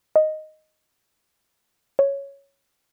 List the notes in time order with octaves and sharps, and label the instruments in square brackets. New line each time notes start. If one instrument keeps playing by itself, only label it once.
[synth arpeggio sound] D#5
C#5